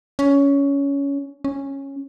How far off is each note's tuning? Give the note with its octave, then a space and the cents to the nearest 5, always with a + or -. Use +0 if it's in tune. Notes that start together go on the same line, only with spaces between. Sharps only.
C#4 +15
C#4 -10